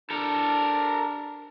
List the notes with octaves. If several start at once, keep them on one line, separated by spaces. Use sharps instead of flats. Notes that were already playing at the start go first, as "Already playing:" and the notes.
D4 A4 A#4